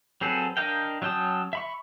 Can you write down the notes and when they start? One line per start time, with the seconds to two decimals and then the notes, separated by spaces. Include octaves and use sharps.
0.21 F#3 C4 G#4 A4 B4
0.57 D4 A#4 D#5 F5 G5
1.02 F#3 C#4 G5 A5 D#6
1.53 E5 B5 C#6